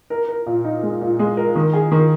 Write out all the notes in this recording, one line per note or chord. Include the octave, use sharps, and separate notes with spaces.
A#4
A#4
A#2
D#4
G#3
A#2
G#3
A#4
D#3
G#4
D#3